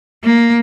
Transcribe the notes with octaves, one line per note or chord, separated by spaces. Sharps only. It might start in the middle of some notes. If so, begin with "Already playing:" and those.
A#3